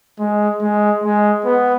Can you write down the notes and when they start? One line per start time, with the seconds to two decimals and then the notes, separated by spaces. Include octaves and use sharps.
0.19 G#3
0.62 G#3
1.03 G#3
1.45 B3